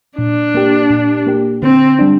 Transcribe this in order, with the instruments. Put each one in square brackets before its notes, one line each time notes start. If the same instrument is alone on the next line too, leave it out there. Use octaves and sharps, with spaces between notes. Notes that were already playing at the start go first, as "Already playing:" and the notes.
[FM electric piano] A#2 [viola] D4
[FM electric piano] A#3 G4
A#2
A#3 G4
[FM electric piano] D3 [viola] C4
[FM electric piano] G3 D4